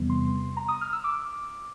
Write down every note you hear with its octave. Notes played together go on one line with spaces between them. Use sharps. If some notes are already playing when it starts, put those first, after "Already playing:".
Already playing: E2 C3 E3 G3 B3
C6
A#5
D#6
F6
E6
D6